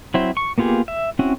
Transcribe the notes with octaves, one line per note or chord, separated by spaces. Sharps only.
F#3 C4 E4 C5
C#6
A#3 B3 F4 G4 G#4
E5
C4 C#4 E4 F#4